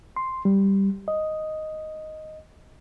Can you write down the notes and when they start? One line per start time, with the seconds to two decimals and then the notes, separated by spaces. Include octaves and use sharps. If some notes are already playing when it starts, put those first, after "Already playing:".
0.16 C6
0.45 G3
1.08 D#5